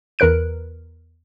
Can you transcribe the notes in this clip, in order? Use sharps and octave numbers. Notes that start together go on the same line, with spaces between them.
E2 A#4 B4 F#6 D7